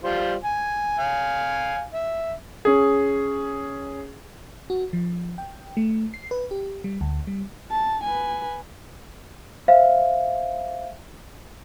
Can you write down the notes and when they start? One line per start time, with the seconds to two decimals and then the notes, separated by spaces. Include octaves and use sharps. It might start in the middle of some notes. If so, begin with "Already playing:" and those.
0.04 G3 F4 C5
0.44 G#5
0.99 F5 G#5
1.94 E5
2.65 C#4 G#4
4.70 F#4
4.93 F3
5.38 G5
5.77 A3
6.14 C7
6.31 B4
6.51 G4
6.84 G3
7.01 D2
7.27 G3
7.71 A5
8.04 B4 G#5
9.68 C5 E5 F5